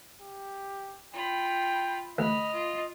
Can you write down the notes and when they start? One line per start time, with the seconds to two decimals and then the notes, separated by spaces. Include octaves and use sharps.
0.21 G4
1.14 F4 G5 B5
2.18 D2 D#5 B5 F6
2.53 F4